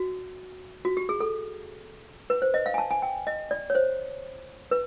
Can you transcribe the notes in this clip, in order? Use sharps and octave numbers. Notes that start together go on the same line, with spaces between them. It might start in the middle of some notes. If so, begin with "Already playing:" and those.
Already playing: F#4
F#4
G4
G#4
A4
B4
C5
D#5
F5
G#5
A5
G#5
G5
D#5
D5
C#5
C5
B4